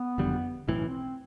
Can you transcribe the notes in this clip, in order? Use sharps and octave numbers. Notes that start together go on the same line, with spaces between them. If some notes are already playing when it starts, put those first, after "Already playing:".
Already playing: B3
F#1 F2 D3 G3
B1 A2 E3 C4
C#4
C4